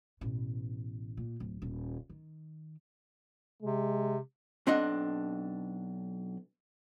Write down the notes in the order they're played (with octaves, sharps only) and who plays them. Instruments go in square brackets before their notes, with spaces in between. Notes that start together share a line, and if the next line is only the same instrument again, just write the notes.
[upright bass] A1 B2
A#2
D1
D#1
D#3
[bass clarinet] C3 [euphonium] G#3
[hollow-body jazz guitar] B1 C4 D4 D#5 F#5